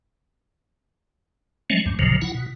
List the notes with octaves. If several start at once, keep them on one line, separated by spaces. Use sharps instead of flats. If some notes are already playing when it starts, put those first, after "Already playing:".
F3 F#3 G#3 A3 C#4
D2 G2
G#1 D#2 A#2 C#3 F3 F#3
E4 F#5
B2